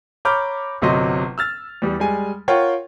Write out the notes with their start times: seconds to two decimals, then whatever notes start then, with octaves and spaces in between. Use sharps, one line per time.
0.25 C#5 A#5 B5 D6 F6 G6
0.82 G1 C3 F#3 D#5 C6
1.38 E6 F6 A6
1.82 E2 G3
2.00 G3 G#3 G#5
2.48 F4 A#4 C#5 F#5 G5